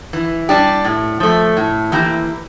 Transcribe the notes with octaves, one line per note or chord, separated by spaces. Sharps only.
E3
G3 D4 G4
A2
F3 A3
A2
E3 A#3 E4 G4